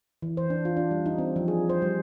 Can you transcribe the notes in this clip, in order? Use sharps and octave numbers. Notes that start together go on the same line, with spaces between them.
E3
C5
D4
F4
D4
G3
D#4
C4
F3
G#4
C5
G3